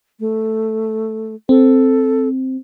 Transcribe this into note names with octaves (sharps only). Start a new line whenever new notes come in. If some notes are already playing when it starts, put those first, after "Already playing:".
A3
C4 A4